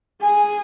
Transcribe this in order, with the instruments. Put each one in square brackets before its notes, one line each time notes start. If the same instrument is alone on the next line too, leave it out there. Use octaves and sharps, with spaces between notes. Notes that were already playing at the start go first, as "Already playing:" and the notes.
[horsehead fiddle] G#4 [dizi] G#5